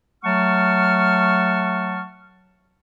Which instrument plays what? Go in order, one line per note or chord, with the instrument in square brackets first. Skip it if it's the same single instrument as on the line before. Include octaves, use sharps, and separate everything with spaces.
[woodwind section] F#3 A3 F#5 A5 C#6 F6